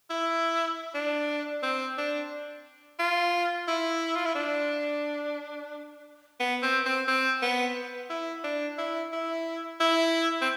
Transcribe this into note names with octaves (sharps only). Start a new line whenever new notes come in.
E4
D4
C4
D4
F4
E4
F4
E4
D4
B3
C4
C4
C4
B3
E4
D4
E4
E4
E4
C4